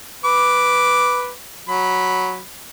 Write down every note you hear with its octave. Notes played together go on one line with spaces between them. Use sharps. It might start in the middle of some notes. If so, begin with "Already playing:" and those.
B4 D6
F#3 B5